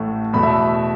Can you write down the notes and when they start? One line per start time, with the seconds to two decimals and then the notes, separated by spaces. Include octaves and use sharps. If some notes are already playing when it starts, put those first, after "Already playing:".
Already playing: A1 A2 A3
0.33 E2 B2 A3 B5
0.43 E5